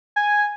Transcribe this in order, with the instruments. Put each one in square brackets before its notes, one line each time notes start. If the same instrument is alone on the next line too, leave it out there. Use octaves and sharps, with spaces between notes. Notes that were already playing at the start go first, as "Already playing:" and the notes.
[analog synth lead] G#5